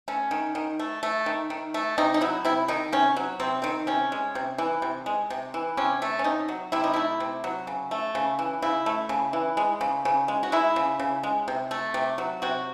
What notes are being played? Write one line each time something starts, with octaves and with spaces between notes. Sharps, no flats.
A3 C#4
D#3
D#3
A3
A3
D#3
D#3
A3
C3 D#4
D#4
F#3 E4
C3 E4
D#3 D#4
C3 C#4
F#3
C3 C4
D#3 C4
C3 C#4
G#3
C3
E3
C3
G#3
C3
E3
C3 C#4
A3
C#4
C3 D#4
F#3
C3 E4
D#4
A3 E4
C3
F#3
C#3
A3
C#3
E3
C#3 E4
A3
C#3
E3
G#3
C#3
C#3
G#3
F#4
G#3 E4
C#3
C#3
G#3
C3
A3
C3
F#3
C3 F#4